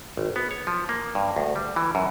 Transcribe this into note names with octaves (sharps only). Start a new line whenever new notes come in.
G#1
B3
C#5
F3
A#3
G2
D2
G3
E3
F#2